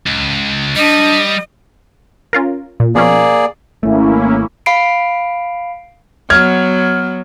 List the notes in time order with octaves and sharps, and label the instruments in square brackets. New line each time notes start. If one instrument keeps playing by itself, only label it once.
[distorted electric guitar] C#2
[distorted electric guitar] G3 [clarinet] D4 [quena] D#5
[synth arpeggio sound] C#4 F4 A#4
A#2
[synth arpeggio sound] B2 F3 C#4 [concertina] A#3 G#4 D5
[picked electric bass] G#1 A3 [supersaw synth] A#3 C#4 E4
[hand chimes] F5 B5 C7 D7
[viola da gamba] F#3 B3 [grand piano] F6 G#6